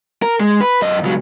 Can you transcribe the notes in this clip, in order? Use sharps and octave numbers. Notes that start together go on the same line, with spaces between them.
A#4
G#3
B4
F#2 D#5
C#2 F#3